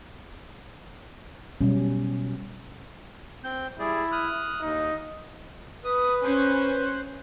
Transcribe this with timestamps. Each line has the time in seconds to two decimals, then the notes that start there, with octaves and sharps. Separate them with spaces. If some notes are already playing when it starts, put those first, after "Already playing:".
1.61 B2 F#3 G3 C#4
3.44 C4 G6
3.80 G3 E4 G#4 D5
4.12 D#6 F6 F#6
4.62 D#2 D#4
5.84 B4 D#6
6.24 C#4 C5 F#6